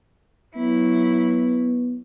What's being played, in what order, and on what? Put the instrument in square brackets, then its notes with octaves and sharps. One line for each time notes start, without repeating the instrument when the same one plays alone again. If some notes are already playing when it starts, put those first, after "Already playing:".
[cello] F#3 E4 [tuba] B3